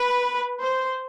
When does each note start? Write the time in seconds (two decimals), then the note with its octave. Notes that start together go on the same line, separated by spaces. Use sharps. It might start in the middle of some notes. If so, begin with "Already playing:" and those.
Already playing: B4
0.61 C5